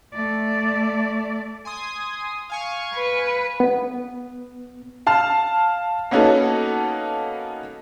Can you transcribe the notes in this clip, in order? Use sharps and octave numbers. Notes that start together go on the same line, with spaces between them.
A3 D5
G#5 C6 D#6
F5 G#5 C#6
B4
B3
F5 A5 F6
A#3 B3 C#4 D#4 F#4 A4